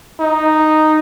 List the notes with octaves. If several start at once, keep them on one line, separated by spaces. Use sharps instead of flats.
D#4